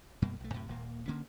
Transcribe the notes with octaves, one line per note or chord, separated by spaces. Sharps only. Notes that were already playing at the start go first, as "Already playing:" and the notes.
F#2 B2 G3 A#3
B1 A3
F#2 A2 C3
D#1 A#2 A#3
D3 A#3 C#4